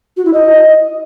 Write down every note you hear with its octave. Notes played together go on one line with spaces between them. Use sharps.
F#4
E4
D#5